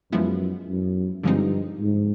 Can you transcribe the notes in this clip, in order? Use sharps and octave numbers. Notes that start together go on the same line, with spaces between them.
F#2 F3 G#3 B3 E4
F#2
G2 D3 F3 G#3 C4 D#4
G#2